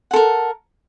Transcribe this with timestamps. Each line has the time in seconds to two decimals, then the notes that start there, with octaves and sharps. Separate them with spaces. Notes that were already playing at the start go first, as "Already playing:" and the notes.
0.11 F#5
0.13 A4
0.16 A#4